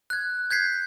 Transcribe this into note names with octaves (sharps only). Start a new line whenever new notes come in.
F#6 G#6
G6 G#6 B6 C7